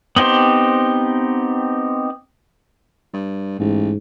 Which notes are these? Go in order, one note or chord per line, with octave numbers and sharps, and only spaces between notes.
B3 C4 D#4 G4 C5
G2
A1 G#2